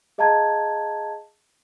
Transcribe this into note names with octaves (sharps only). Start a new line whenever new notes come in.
G#4 D#5 F5 A5 A#5 G#6